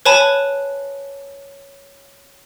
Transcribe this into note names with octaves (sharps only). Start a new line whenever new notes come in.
B4 C#5 G#5 A5 B5